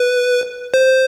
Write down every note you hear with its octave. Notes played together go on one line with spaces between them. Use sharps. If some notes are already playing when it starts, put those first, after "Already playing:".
Already playing: B4
C5